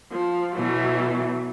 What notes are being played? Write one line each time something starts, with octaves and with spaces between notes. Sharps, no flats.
F3
B2 E3 F#3 A3